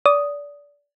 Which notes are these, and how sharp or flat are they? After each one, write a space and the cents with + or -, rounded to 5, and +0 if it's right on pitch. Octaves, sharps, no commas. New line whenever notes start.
D5 -25 D#6 +0